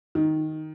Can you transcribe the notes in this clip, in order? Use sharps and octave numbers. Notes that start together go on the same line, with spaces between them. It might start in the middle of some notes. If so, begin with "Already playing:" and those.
D#3